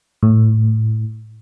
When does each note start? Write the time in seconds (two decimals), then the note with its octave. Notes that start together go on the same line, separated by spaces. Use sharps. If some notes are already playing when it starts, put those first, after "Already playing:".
0.23 A2